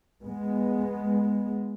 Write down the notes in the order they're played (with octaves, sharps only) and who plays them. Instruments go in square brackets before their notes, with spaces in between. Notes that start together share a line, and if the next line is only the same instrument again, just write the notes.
[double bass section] G#3 B3